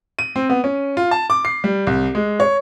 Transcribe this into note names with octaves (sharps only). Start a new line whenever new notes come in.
D#7
C4
B3
C#4
F4
A5
D6
C7
G3
C2
G#3
C#5